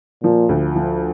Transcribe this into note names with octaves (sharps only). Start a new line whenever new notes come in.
A#2 F3
D2
F3